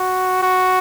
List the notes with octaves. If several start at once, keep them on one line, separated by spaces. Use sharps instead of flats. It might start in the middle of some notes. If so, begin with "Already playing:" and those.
Already playing: F#4
F#4